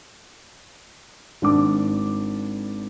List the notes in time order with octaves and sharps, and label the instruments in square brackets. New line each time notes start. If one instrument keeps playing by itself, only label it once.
[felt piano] G#1 D4 D6